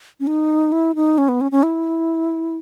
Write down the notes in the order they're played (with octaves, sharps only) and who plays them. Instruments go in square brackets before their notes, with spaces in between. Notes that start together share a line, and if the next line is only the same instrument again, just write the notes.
[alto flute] C#4
D#4
E4
D#4
C#4
B3
C#4
C#4
E4